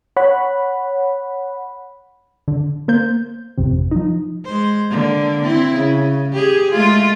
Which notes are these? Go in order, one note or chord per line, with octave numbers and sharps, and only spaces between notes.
C#5 F#5 B5
D3
A#3 C5 G6
G#1 F2 C3
F3 D#4
G#3 C5
D3 A#3
C4 E4
C#3
G4 G#4
G#3 A3 F4